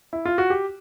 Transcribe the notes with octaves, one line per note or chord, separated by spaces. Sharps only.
E4
F4
F#4
G4